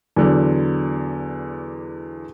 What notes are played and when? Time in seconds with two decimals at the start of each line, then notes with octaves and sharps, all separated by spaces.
0.16 E2 D3 F#3